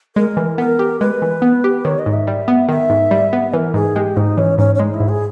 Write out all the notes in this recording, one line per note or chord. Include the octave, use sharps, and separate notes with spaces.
G#3 A#4
E3
B3 A#4
G4
G#3 B4
E3
B3
G4
D#3 C#5
D#5
G#2
E5
G3
B3
D#3 E5
G#2
G3
B3
E3 A#4
G#2 G#4
G#3 G4
G#2 D#4
E3 C#4
G#2 C#4
C#4
G#3 D#4
E4
G#2
G#4